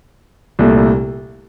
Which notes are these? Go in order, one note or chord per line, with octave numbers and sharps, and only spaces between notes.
C2 A#2 A3